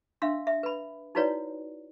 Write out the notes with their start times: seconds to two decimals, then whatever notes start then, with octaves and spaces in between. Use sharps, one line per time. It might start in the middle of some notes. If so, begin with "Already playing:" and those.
0.22 D4 E5 F5 C6 E6
0.47 E5
0.63 B4 B5
1.15 D#4 E4 F#4 B4 C#5 D5